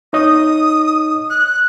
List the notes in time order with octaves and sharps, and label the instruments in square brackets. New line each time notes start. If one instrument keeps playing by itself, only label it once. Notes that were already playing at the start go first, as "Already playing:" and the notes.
[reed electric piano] D#4 C#5 D#5 [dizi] D#6
[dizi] F#6